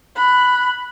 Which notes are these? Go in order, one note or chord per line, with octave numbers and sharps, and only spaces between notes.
B5 F#6